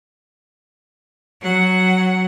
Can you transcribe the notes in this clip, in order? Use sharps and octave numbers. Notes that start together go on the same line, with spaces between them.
F#3 F#5